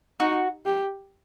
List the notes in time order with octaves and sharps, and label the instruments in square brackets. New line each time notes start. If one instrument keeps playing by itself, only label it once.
[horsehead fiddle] D#4 [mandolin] F#4
[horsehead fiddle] G4